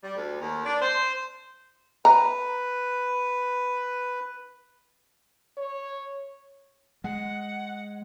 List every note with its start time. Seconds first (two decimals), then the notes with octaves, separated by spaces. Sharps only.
0.02 G3
0.15 D2
0.40 D#2
0.64 D4
0.82 C5
2.05 B4 A#5
5.57 C#5
7.04 G#3 F#5